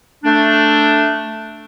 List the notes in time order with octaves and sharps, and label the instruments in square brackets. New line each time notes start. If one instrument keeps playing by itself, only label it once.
[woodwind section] A3 D4